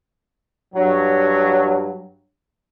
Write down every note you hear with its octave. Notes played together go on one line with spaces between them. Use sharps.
G2 F#3